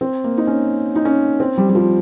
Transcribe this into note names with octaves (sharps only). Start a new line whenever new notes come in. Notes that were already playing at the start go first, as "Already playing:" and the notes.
C4
A#3
D#4
C#4
D#4
C#4
C4
G3
G3
F3